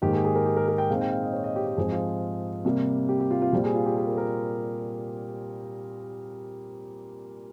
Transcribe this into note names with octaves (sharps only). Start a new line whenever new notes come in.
G#2 D#3 A#3 G4
G#4
G#4
A#4
G4
A#4
A#4
G5
A#2 G#3 C4 D#4 F5
G5
F5
D#5
C#5
D#5
G4
G4
G#2 F3 C4 D#4 G#4
F4
C3 G3 A#3
G4
G4
F4
F4
A#2 G3 C4 G4
G#4
F4
G4
G#4
A#4
A#4